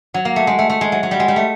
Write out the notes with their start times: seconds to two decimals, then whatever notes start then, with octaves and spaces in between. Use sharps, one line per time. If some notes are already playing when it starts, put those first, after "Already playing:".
0.14 F#3
0.25 A#3
0.36 A3
0.47 G#3
0.59 A3
0.70 A3
0.81 G#3
0.92 F#3
1.03 F#3
1.11 G3
1.20 G#3
1.28 G3
1.36 A3